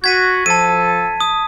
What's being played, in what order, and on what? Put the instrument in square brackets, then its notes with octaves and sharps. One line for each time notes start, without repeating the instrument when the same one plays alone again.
[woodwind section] F#4 [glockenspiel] G#6 B6 D#7
[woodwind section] F3 A4 [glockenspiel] A5 D#7
[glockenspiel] D#6